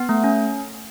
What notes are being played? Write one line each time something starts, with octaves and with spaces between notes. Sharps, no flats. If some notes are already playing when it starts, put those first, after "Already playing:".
Already playing: B3
A3
C#4